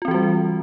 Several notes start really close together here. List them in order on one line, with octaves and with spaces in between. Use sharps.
F4 C4 E3 F#4 G3